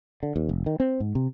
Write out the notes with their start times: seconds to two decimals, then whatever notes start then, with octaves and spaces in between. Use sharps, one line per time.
0.23 D3
0.36 D#2
0.49 F1
0.66 D#3
0.80 C4
1.00 G#2
1.15 C3